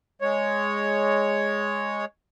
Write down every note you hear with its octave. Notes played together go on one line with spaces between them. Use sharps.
G#3 C#5